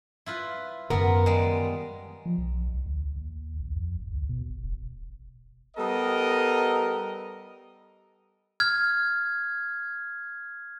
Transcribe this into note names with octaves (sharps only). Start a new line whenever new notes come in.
E4 F4 B4
F#2 D#3 B3 F4 A#4
G3 G#3
F3
B1
C2
D2
D#2
A#1
F2
A1
D2
B2
G#1
E1
G3 B3 A4 A#4 D#5
F6 G#6